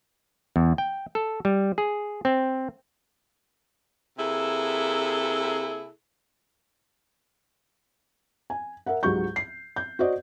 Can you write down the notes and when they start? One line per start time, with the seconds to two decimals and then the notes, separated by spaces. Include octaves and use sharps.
0.56 E2
0.78 G5
1.15 A4
1.45 G3
1.78 G#4
2.25 C4
4.18 C3 A#3 E4 G#4 A4
8.50 G#5
8.86 A#4 E5 F#5
9.03 C#2 G#2 F#3 G4 C#6 G6
9.36 C7
9.76 G6
9.99 F#4 C5 D5 D#5